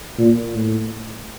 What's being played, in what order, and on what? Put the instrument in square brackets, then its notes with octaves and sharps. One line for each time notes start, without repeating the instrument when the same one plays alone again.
[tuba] A#2
A2